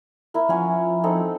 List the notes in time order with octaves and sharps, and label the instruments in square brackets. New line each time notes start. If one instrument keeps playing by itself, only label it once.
[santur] E4 A#4
[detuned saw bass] F3 [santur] C#4 F#5 G#5
[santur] C4 D#4 A4